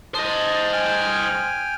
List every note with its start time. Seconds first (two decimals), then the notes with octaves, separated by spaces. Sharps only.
0.14 C5 D#5 A5 D#6
0.73 G5 G#5 F6